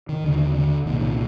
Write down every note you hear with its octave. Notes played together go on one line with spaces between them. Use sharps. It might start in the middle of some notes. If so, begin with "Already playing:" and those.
D#3
D#2 D3
D3
C2 A#2 D#3
D#3